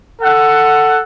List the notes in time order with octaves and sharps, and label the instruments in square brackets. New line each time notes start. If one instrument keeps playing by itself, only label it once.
[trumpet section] A4 F#5